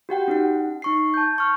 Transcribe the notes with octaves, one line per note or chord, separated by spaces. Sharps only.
F#4 G4 F#5 G5
C#4 D#4 F#5
D#4 C#6 C7
A5 G6
C#6 F6